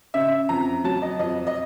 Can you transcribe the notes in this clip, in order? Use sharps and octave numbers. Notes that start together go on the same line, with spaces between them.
C#3 E5
F2 A#5
F#3 A5
D#5
F2 D#5
D#5